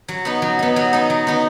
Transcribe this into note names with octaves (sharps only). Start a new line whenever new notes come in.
F#3
B3 D#4
F#3
B3 D#4
F#3
B3 D#4
F#3
B3 D#4